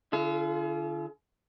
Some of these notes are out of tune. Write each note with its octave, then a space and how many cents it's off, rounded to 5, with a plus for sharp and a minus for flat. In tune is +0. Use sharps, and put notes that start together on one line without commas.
D3 +0 F4 -35 G#4 +45